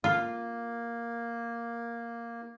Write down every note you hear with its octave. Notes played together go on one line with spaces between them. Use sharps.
A#3 F4